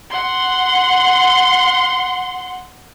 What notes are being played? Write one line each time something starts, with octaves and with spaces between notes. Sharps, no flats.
F#5 C6